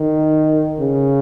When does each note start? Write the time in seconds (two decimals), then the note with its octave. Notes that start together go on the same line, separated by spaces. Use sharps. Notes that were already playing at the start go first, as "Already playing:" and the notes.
Already playing: D#3
0.79 C#3